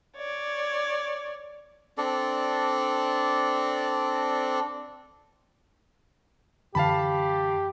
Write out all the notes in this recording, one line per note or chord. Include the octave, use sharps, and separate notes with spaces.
C#5 D5
C4 D4 A4 D5
F#2 D3 E3 G4 F5 A5 B5